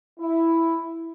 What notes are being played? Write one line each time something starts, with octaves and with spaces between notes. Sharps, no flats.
E4